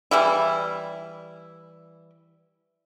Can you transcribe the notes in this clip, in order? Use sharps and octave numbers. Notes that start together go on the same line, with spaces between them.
E3 G3 E4